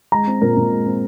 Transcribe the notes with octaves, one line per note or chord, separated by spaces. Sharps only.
G#3 A#5
C4
A#2 A#4
A#2
G#3
C4